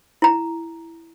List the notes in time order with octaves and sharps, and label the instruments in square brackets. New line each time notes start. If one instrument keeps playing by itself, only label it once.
[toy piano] E4 A#5